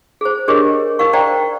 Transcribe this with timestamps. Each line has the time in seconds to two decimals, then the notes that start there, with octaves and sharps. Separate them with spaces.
0.21 G#4 C5
0.48 D4 G4 G#4 A#4 C#5 D#5
0.99 D#4 A#4 F5 C#6
1.13 C5 D5 F5 G5 A#5